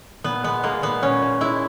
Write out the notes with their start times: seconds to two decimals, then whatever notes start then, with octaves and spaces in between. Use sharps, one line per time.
0.24 A#2 B3
0.44 G#3 B3
0.63 G#3 A#3
0.82 A#2 B3
1.02 A#2 C#4
1.22 A#2
1.41 G#3 E4